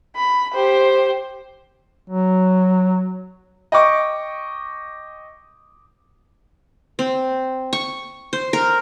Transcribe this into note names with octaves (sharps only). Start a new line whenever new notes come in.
B5
G4 C5
F#3
D#5 G5 C#6 D6
C4
C#6
C5
A#4